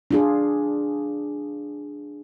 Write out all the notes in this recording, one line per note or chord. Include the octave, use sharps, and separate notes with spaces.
D4 F4 G#4